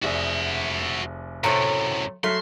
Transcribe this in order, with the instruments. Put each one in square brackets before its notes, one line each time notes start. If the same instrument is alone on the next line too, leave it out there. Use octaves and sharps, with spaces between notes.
[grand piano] F1 G#4 D5 [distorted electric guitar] F#4 E5
[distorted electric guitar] F#2 A2 [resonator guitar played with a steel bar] C3 A3 C#5
[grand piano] F#3 F6 B6 [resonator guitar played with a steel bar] A3 [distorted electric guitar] C6